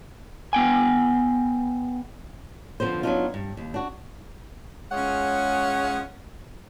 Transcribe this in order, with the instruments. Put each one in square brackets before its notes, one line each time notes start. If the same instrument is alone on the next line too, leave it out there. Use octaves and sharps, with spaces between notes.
[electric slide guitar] B3 G5 G#5
[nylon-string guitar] D3 F3 B3 C5
F#3 B3 C4 D4 D#4 F4
G2
D#2
D4 F#4
[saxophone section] G#3 C#4 F4 G#4 C#5 F#5